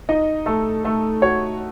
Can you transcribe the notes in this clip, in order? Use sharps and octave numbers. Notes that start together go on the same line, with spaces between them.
D#4 D#5
A3 A4
A3 A4
F#4 C#5